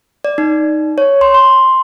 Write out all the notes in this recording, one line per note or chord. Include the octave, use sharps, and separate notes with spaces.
D5
D#4
C#5
C6
C6